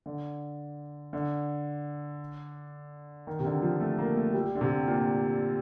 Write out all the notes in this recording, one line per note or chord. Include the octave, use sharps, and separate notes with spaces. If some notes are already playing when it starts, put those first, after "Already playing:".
D3
D3
D#3
C3
D3
F3
A3
A#3
A3
G3
D3
C3
A#2